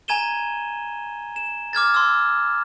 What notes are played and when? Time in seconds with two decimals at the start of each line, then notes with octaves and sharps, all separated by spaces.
0.08 G#5 A#5 G#6 D#7 E7 G7
1.36 E7
1.73 D6 F6 G#6 A6
1.94 C6 E6